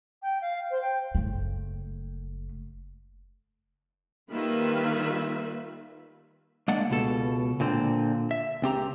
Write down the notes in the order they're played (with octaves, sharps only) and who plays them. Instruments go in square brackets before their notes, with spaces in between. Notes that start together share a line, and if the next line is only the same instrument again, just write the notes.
[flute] G5
F5
C5
G5
[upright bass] F#1 A3
[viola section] D#3 G3 A#3 F4 B4 E5
[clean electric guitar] G#3 A#3 D4 F#5
C#2 B2 A4
A#2 D3 C4
E5
C#2 C4 G4 A#5